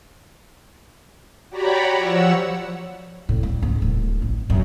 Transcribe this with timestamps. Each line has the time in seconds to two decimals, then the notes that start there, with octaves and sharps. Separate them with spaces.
1.49 F#4 G4 C#5 D5 A#5 B5
1.97 F3 C#5 F#5 E6
3.29 A2
3.43 G3
3.62 G#2
3.82 D1
4.22 A1
4.50 F#2